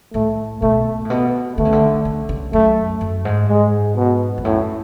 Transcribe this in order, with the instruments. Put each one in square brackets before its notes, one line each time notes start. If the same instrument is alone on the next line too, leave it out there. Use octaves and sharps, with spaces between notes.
[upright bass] A2 [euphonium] A3
[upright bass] B2 [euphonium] A3
[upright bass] A2
[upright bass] B2 [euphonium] B3
[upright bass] D3 [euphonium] A3
[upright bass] C#3
D3
C#3
C#3
[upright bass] F#2 [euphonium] A3
[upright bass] F#2
G#2
[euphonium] G#3
B2
[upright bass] F2
[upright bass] F#2 [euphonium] A2